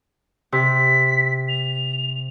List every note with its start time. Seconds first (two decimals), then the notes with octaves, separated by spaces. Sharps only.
0.52 C3 B6
1.48 F7